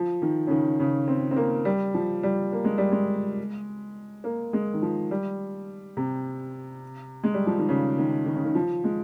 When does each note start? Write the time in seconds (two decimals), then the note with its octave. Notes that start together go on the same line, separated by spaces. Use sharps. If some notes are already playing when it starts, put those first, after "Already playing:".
Already playing: F3
0.22 D#3
0.47 C#3
0.50 D#3
0.80 C#3
1.08 C4
1.31 C4
1.36 A#3
1.65 G3
1.94 F3
2.23 G3
2.52 A#3
2.65 G#3
2.78 G3
2.92 G#3
4.24 A#3
4.53 G#3
4.74 D#3
4.82 F3
5.11 G3
5.97 C3
7.24 G#3
7.34 G3
7.47 F3
7.58 D#3
7.69 C#3
7.98 D#3
8.26 D#3
8.36 C#3
8.45 D#3
8.55 F3
8.84 G#3